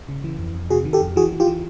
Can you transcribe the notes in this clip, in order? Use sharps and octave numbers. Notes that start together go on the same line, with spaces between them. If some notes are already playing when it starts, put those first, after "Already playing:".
C#3
E3
F2
F2
C3 F#4 G#4
D#3
G4 A4
F2
E3 F#4 G#4
E3
F4 G4
E3